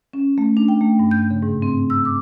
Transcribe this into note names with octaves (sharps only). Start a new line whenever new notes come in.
C#4
A3
D4
G5
A3
G2
G6
C#3
G#2
C4
E6
D6